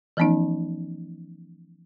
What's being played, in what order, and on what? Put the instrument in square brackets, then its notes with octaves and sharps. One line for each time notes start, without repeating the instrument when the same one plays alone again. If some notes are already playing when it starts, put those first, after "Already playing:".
[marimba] E3 F3 A3 B3 C#4 D#4